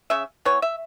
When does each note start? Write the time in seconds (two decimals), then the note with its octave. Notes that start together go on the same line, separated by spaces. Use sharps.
0.10 C#3 E5
0.45 E3 B3 C#5
0.62 E5